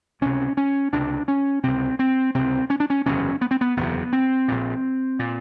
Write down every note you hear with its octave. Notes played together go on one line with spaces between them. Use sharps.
C#2 C3 C#4
C#4
C#2 C3 D4
C#4
C#2 C3 C4
C4
C#2 C3 C4
C#4
D4
C#4
F#1 E2 C3 C#4
B3
C4
B3
F#1 E2 C3 B3
C4
A#1 A#2
A#2